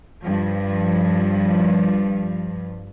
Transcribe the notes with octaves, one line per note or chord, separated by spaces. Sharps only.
G2 F3